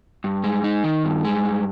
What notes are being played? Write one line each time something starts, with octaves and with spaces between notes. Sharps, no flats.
G2
G#3
D#4
D#3
G2
G#3
G2